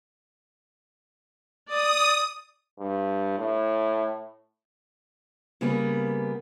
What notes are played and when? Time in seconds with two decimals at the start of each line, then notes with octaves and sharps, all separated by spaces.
1.69 D5 D#6
2.79 G2
3.38 A2
5.61 C#3 G3 A#3 B3